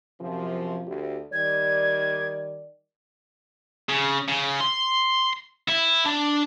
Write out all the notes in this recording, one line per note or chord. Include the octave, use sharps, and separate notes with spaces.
F#2 C3 F3
D2 G4
D#3 G3 D5 G#6
C#3
C#3
C6
E4
D4